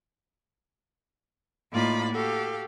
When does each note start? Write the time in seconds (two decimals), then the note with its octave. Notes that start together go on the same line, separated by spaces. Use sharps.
1.71 A2 A#3 D#4 F4 D5 B5
2.10 F#4 G4 A4 F5